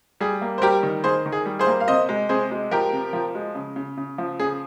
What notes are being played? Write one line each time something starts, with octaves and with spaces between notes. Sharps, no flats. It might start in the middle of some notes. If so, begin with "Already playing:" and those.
G3 G#4
A#3
C5
G3 G4 A#4
D#3
D#3 G#4 C5
D#3
G#4
G3
G#4 C5
A#3
F5
C3 C5 D#5
G#3
C3 G#4 C5
G#3
F3 G4 A#4
C3
F3
G#3
C#3
C#3
C#3
F3
C#3 G#4